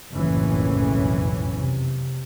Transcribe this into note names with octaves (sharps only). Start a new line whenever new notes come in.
F#1 B1 F2 A2 E3 C#4
C3